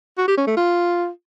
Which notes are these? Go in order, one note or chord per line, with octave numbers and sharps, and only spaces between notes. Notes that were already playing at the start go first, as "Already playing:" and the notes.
F#4
G4
C#4
A3
F4